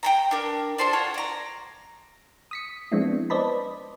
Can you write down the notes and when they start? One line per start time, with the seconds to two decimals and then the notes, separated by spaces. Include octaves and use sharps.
0.03 G5 G#5 A#5
0.31 D4 A#4
0.78 F4 A4 C5 D5
0.93 F4 C#5 F#5
1.14 D5 A#5
2.51 D#6 B6 C#7
2.92 F3 G#3 B3 C4 D4 E4
3.30 B4 C5 D5 D#5 A5 B5